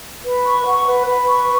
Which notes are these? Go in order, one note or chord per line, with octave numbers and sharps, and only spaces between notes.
B4
C#6
F#5
B4
B4
C#6